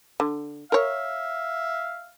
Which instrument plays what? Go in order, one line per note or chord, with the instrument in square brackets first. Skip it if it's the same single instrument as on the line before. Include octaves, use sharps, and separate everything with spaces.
[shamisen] D3
[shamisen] A#4 C#5 [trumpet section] E5 F5